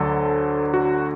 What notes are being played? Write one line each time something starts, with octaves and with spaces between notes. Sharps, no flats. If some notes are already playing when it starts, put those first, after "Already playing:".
Already playing: D2 D3 F#3 A4
F#4